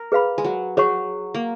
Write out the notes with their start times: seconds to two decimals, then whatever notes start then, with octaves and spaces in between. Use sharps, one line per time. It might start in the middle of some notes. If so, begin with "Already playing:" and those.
Already playing: A#4
0.12 G#4 B4 F5 B5
0.38 G#3
0.44 F#3
0.77 F#3 G#4 C#5 F#5 C#6
1.34 A#3